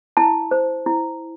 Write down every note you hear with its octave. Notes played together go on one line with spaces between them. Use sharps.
E4 A5
C5
E4